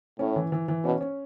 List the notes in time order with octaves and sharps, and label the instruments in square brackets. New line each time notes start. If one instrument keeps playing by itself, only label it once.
[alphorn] A2 [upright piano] C#4
[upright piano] E3
E3
E3
[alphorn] B2 [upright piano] C#4
[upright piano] C#4